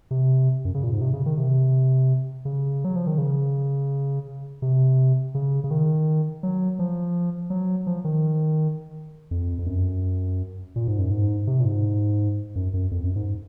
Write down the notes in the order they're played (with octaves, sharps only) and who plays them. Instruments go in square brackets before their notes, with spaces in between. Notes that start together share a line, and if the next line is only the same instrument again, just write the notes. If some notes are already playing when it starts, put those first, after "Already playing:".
[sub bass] C3
F#2
C#3
A#2
G#2
C3
C#3
D#3
C3
C#3
F#3
F3
D#3
C#3
C3
C#3
C#3
D#3
F#3
F3
F#3
F3
D#3
F2
F2
F#2
A#2
G#2
F#2
G#2
C3
A#2
G#2
F#2
F#2
F2
F#2
G#2